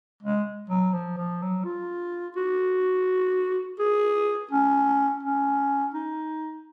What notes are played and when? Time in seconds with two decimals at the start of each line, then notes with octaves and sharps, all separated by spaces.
0.23 G#3
0.70 F#3
0.93 F3
1.17 F3
1.42 F#3
1.64 F4
2.36 F#4
3.79 G#4
4.51 C#4
5.23 C#4
5.94 D#4